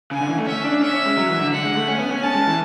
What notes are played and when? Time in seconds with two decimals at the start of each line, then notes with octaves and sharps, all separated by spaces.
0.11 C#3 G#5
0.21 D3
0.29 E3
0.38 A3
0.47 C#4 E5
0.64 D4
0.82 C#4 E5
0.95 C#4
1.06 G#3
1.18 F#3
1.29 E3
1.40 D3
1.53 D3 F#5
1.65 G#3
1.77 A3
1.88 C#4 G#5
1.99 B3
2.11 C#4
2.23 C#4 A5
2.35 G#3
2.47 E3